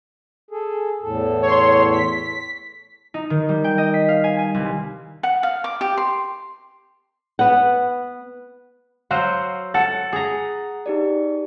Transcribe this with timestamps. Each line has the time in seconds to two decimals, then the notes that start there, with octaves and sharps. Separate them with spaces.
0.51 G#4 A4
1.03 E2 A2 A4
1.42 C#5 C6
1.92 B6
3.14 D#4
3.30 D#3
3.49 G3
3.64 G5
3.78 D#5
3.94 B6
4.09 F5
4.24 G#5
4.39 G#5
4.54 C2
5.23 F#5
5.43 F5
5.64 D6
5.81 G4
5.97 C6
7.39 B3 F#5
9.11 F#3 F#4 C5 F5 C6 E6 G6
9.74 A4 F#5 A6
10.13 G#4 A#5
10.86 D#4 G4 D5